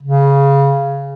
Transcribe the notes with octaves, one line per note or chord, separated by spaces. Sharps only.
C#3